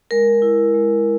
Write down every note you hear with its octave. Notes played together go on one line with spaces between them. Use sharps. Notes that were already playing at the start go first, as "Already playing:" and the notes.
G#3 A#4
E4
G#3